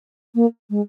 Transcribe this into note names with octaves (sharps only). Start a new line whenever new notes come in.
A#3
G#3